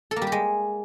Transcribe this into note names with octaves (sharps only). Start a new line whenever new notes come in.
A4
A#3
G3
G4
G#3